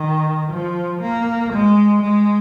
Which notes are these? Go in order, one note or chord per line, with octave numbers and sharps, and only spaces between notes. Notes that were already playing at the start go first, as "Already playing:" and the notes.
Already playing: D#3
F3
A#3
G#3
G#3